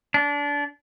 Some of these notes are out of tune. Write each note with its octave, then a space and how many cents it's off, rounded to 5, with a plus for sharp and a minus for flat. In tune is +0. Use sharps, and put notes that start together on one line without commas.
D4 -25